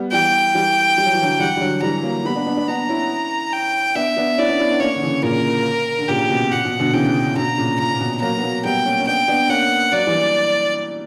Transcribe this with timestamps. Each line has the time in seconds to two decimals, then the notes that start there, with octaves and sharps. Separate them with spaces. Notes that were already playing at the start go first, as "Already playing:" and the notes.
Already playing: G3 B3
0.11 E3 G3 G5
0.54 E3 G3
0.98 G3
1.06 F#3
1.14 E3
1.22 D3 F#3
1.39 E3 G3 F#5
1.57 G3
1.61 D3 F#3
1.82 E3 G3 A#5
2.03 F#3 A#3
2.25 G3 B3 B5
2.35 B3 D4
2.46 B3 D4
2.57 B3 D4
2.68 B3 D4 A#5
2.89 C#4 E4
3.53 G5
3.95 B3 D4 E5
4.17 B3 D4
4.38 C#4 E4 D5
4.49 B3 D4
4.59 C#4 E4
4.70 B3 D4
4.80 A#3 C#4 C#5
4.95 D3
5.02 C#3 E3
5.23 A#2 C#3 A#4
5.99 D3
6.08 A#2 C#3 G4
6.21 C#3
6.30 B2
6.51 A#2 F#5
6.65 B2
6.79 B2 D3
6.93 C#3 E3 G5
7.36 B2 D3 A#5
7.58 A#2 C#3
7.79 A#2 A#5
7.94 A#2
8.00 B2
8.21 F#3 A#3 A#5
8.38 B3
8.43 F#3 A#3
8.65 G3 B3 G5
8.86 A#3 C#4
9.00 C#4
9.07 B3 D4 G5
9.28 B3 D4
9.49 A#3 C#4 F#5
9.92 F#3 A#3 D5
10.07 E3 G3